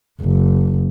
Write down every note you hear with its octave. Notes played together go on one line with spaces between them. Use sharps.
F#1